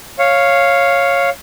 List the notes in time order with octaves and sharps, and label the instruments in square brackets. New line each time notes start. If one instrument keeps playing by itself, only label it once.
[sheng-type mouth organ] C#5 F5